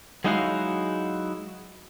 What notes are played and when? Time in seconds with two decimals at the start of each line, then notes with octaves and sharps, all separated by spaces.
0.24 F#3 G#3 D#4 E4 F#4 F5